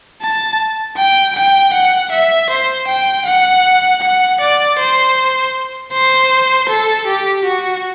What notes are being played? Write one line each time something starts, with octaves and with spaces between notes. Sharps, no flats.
A5
G5
G5
F#5
E5
C5
G5
F#5
F#5
D5
C5
C5
A4
G4
F#4